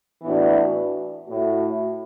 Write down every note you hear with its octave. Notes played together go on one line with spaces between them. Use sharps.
A2 E3 B3 D4 F#4
A2 A3 F#4